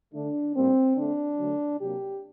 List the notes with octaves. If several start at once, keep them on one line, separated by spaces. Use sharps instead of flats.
D3 A3 D4
A2 G3 A#3 C4
D3 A3 D4
D3 F#3 A3
C3 F#3 A#3 G4